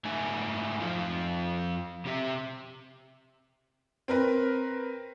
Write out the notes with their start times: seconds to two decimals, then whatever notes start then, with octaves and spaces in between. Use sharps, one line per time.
0.05 G#2 A3 D#4 E5 G#5
0.80 F2 F3 F4
2.05 C3 G4 E5
4.08 C4 A#4 B4